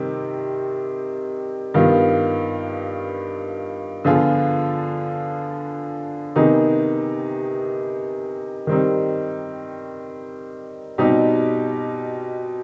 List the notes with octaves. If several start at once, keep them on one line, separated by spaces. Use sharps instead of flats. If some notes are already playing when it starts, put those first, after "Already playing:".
Already playing: C3 D#3 G3 C4
G2 D#3 B3 F4
D3 F3 B3 F4 G#4
C3 D#3 B3 D#4 G#4
D#3 G3 C4 D#4
B2 G3 C4 D#4 G4